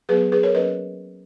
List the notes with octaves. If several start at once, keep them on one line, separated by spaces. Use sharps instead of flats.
F#3 B3 G#4 B4
G#4 B4
A#4 C#5
F#3 A#3 C#4 B4 D#5